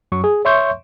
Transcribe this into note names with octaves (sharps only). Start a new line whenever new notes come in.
F#2 F#3 C#6
G#4
C#5 E5 C6 C#6 G6